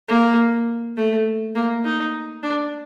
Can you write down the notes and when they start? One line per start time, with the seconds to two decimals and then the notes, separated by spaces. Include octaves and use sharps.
0.09 A#3
0.97 A3
1.55 A#3
1.85 D#4
2.43 D4